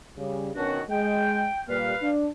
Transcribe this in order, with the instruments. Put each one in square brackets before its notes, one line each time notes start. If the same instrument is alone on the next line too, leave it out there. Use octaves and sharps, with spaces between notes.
[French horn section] C#3 G3
[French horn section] B2 D#3 C#4 [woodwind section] D4 F#4
[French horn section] G#3 [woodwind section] G5
[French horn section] A#2 G3 A#3 [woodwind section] B4 F5
[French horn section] D4